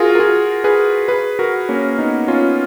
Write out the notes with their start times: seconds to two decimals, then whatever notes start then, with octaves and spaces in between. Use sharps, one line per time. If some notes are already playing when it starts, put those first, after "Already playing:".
Already playing: F4 F#4 G#4 A#4
0.15 A#4
0.19 F4 G#4
0.64 G#4 B4
1.08 G#4 B4
1.39 F#4 A#4
1.69 A#3 C#4
1.99 B3 D#4
2.28 C#4 F4